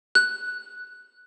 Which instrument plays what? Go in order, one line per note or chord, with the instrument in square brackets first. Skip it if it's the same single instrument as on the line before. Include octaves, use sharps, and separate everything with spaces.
[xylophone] F#6